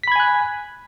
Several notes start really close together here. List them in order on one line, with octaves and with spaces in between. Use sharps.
B6 B5 G#6 G#5 F#6